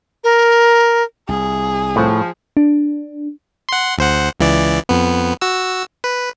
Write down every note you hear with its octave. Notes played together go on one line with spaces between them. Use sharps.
A#4
C2 G#4
A2 F3
D4
F#5 C6
D2 C5 F#5
C#2 E3 D5
F2 B3
F#4 E6
B4